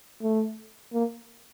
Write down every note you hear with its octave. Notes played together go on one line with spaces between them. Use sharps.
A3
A#3